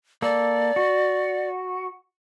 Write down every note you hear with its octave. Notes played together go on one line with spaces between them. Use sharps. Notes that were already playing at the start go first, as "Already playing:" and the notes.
A#3 A4 D5
F#4